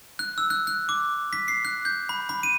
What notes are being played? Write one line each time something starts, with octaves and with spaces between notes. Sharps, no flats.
F#6
E6
F#6
F#6
D6
B6
C7
F#6
G6
B5
B5
D#7